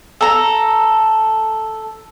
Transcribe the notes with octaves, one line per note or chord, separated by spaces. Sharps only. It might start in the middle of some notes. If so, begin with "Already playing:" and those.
A4 A#5